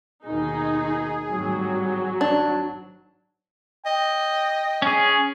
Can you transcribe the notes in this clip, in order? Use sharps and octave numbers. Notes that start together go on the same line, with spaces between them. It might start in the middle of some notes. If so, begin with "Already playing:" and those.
D#2 B2 D#3 D#4 G#4
G#1 A2 F#3 G3
G#1 D4
D#5 G5
C#4 G#4